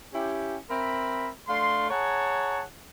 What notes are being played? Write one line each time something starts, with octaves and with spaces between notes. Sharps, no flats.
C#4 E4 G4
C4 A#4 E5 B5
A3 D4 F5 C6
G#4 C#5 F#5 A5 A#5